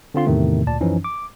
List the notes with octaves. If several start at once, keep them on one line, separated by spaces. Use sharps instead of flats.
D3 C4 F4 C6
E2 A2 C3 D#3 A3
D2 A#2 D5 A5
F#2 E3 F3 C#4 D#4
D6